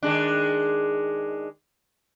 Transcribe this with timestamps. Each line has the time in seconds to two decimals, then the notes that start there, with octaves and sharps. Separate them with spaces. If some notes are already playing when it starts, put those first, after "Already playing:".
0.03 D#3 G#3 D4